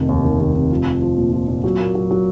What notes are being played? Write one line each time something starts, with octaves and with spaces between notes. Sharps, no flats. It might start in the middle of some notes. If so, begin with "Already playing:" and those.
Already playing: F1 D#3
D#2
D#3
D#2
F1
F3
F3
F3
A#2
F3
A#2
F#3
A#3
F#3
F#3